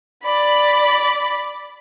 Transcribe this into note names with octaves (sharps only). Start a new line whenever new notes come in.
D5 B5